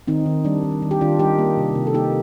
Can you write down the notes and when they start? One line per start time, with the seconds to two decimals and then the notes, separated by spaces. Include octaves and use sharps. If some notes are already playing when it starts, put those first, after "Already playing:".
0.08 D#3 C4 D#4
0.26 D#3
0.45 G3 D4
0.63 D#3
0.82 D#3
0.91 G4
1.01 D#3 D4 F4
1.19 G3 D#4 G4
1.39 A#3
1.57 C3
1.75 C3
1.87 A4
1.94 A#3 D#4 G4